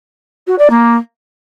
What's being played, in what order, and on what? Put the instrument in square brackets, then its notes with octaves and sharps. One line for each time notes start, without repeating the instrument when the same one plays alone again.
[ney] F#4
D5
A#3